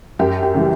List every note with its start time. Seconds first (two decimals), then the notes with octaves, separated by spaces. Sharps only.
0.19 F#2 G4
0.43 G4
0.54 C#3 E3 G3